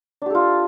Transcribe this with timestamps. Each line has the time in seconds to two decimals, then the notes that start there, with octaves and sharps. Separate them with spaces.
0.22 D4
0.26 G4
0.30 A4
0.35 F4